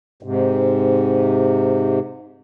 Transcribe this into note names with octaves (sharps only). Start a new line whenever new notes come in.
G#2 C3